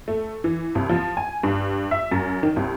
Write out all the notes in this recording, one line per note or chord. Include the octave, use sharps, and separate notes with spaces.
A3
E3
C2
F3
G#5
G2
E5
F#2
D#3
C2